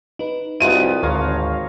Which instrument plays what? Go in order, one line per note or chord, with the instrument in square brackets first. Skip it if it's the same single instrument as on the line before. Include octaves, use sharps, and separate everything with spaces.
[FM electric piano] D#4 B4
[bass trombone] C2 [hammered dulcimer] F3 B3 [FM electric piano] F#4 D#5 E5 [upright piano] D#7
[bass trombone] G#1 [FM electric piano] D2 [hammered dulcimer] C#5 F5 A#5